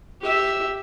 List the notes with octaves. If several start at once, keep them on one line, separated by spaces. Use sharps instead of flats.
G4 E5